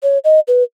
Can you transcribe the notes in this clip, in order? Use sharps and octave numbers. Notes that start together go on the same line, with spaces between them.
C#5
D#5
B4